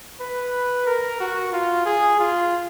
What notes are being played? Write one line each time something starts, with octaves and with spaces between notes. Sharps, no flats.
B4
A#4
F#4
F4
G#4
F4